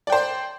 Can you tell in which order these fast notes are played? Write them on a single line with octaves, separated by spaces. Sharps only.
D5 G5 C5